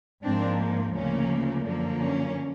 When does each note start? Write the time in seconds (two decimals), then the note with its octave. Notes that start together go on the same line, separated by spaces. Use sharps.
0.23 G#2 F3 A#3 C4 D4
0.94 D2 C#3 F3 A#3 C#4
1.64 F#2 D3 F3 A#3
1.99 C#4